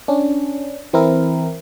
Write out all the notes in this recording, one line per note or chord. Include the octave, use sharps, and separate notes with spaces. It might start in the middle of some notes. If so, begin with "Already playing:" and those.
C#4 D4
E3 C4 E4 A#4